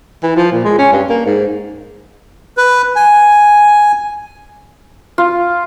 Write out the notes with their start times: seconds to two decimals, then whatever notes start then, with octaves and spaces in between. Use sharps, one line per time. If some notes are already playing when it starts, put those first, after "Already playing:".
0.23 E3
0.37 F3
0.52 A#2
0.64 G#3
0.78 C#4
0.93 G2
1.09 A#3
1.26 G#2
2.57 B4
2.96 G#5
5.18 F4